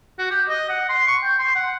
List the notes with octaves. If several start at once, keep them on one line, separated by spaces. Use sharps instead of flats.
F#4
G4
D#5
F#5
C6
C#6
G5
C6
F#5